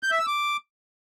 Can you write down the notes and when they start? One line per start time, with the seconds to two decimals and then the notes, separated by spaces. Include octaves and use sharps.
0.03 G6
0.11 E5
0.19 E6
0.27 D6